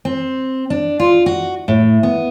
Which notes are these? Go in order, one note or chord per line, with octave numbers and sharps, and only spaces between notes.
C4
D4
F4
F#4
A2
B3